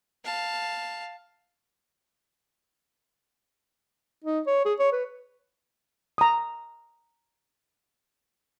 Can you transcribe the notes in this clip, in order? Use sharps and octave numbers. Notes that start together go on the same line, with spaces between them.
F5 A5
D#4
C#5
G#4
C#5
B4
A#5 D#6